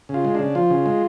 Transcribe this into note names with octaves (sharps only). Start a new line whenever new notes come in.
C#3
F4
G#3
C#3 D4
F3 F4
C#3
G#3